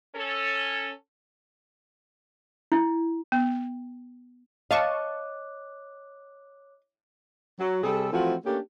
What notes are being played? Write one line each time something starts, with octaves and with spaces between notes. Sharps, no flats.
C#4 A4
E4
B3
C#5 D#5 F5 A5 C#6 D6 F#6
F#3
C3 G3 G#4 A4
E3 F3 A3 C4 F4 F#4
A3 A#3 C#4 D4 G4